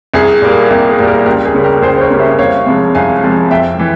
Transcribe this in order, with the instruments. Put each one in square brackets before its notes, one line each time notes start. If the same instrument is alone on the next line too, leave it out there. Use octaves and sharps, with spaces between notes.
[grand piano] C2 G#4
A#2 G3 A#3
C2 G4
G#4
A#2 G3 A#3
G4 A#4
C#2 G4 A#4
G#4
C#3 G3 A#3
G4 A#4
C#2 G#4 C5
C5
A#4 C#5
C#3 G3 A#3
C5 E5
C2 C#5 F5
C3 F3 G#3
C2 F5 G#5
C3 F3 G#3
F2 E5 G5
E3